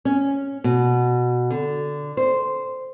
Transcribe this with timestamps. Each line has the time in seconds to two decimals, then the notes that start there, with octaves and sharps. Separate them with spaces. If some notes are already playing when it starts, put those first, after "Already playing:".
0.05 C#4
0.64 B2
1.51 D3
2.17 C5